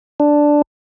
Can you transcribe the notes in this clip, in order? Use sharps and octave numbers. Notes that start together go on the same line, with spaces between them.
D4